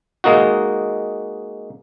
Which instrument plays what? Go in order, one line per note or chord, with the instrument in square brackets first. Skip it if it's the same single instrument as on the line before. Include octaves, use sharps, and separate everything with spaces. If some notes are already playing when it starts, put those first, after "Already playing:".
[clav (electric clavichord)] G#3 A#3 D#4 F#4